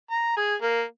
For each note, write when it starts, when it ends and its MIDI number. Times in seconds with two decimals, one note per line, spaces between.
0.11 0.33 82
0.37 0.55 68
0.62 0.82 58